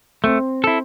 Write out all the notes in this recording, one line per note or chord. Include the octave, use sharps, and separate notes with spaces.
A3 C4
E4 A4